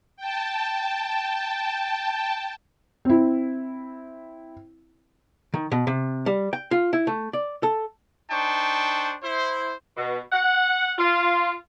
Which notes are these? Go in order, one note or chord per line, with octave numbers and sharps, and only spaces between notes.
G5 A5
C4 E4
D#3
B2
C3
G3
G5
F4
E4
A3
D5
A4
D4 D#4 C5 G5 A5 C#6
E4 C5
B2
F#5
F4